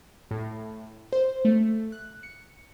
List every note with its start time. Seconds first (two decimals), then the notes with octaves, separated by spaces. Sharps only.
0.31 A2
1.13 C5
1.45 A3
1.92 F#6
2.23 C#7